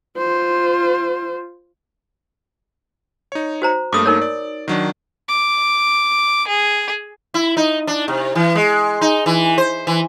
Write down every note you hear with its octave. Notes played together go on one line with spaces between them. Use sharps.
F4 C5
D#4 C#5
F#4 C5 A#5
G2 A3 A#3 D6 D#6
D#4 A#4 C#5
D5
D#3 F#3 D4
D6
G#4
E4
D#4
D4
C3
E3
G#3
D#4
E3
C5
E3